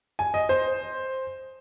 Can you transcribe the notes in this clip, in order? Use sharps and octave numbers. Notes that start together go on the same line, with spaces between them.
G#5
D#5
C5